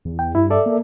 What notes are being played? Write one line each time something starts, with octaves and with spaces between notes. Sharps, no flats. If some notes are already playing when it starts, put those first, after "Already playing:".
E2
G5
G2 E4
A4 D5 E5
A#3